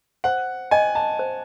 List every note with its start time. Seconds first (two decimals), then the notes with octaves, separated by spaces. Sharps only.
0.24 C5 F#5
0.71 D#5 G5 G#5
0.95 A5
1.19 C5